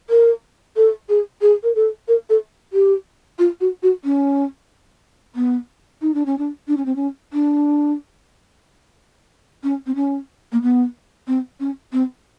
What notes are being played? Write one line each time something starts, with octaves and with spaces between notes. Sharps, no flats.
A#4
A4
G#4
G#4
A#4
A4
A#4
A4
G4
F4
F#4
F#4
C#4
B3
D#4
D4
C#4
D4
D4
C#4
C4
C#4
D4
C#4
C4
C#4
A#3
B3
C4
C#4
C4